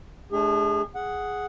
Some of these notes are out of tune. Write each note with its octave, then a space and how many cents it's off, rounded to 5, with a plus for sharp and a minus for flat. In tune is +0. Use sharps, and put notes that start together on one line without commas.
A3 -45 D4 +0 G#4 -35
G#4 +0 F#5 +0